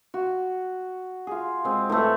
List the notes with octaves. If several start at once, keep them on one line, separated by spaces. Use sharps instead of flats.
F#4
F4 G#4
G#3 C4
A2 E3 A3 E5